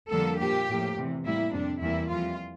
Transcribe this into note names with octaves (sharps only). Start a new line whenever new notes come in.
F2 D3 G3 A#3 A4
A#2 F3 A#3 G4
A2 F3 A#3
E2 C3 E3
A2 G3 A#3 E4
F2 C3 G3 D4
E2 E3 G3 A#3 E4
F2 E3 G3 F4